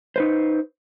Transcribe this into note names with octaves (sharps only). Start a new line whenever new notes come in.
D#4 B4 C5